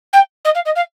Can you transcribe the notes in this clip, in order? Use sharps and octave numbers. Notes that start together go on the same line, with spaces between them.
G5
D#5
F5
D#5
F5